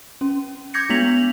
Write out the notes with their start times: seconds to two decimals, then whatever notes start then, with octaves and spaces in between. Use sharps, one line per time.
0.21 C#4
0.74 D6 G6 G#6 A#6 C#7
0.89 G#3 B3 D4 B6 F7 F#7